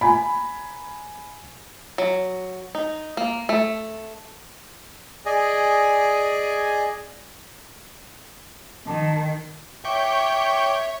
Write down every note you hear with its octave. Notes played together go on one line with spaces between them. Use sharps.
G#5 A#5 B5
F#3
D#4
A#3
A3
G#4 D5 D#5 G#5
D#3 A5
C#5 E5 G5 C#6 D6